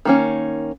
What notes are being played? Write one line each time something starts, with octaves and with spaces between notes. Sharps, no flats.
D#3 A#3 C#4